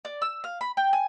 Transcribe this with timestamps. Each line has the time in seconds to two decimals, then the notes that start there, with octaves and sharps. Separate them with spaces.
0.05 D5
0.22 E6
0.44 F5
0.61 B5
0.77 G5
0.93 G#5